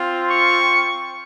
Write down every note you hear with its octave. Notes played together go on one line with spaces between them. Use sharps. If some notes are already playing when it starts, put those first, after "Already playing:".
Already playing: C4 F4
C#6